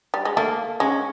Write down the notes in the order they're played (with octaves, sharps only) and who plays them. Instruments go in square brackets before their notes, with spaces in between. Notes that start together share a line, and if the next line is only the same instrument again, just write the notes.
[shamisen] G3
G#3
[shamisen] A3 [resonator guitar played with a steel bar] A#3
[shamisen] G#3 [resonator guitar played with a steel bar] C#4